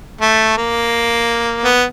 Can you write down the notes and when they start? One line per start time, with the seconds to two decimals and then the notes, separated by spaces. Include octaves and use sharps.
0.21 A3
0.58 A#3
1.65 B3